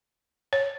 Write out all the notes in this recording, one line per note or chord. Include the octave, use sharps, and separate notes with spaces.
C#5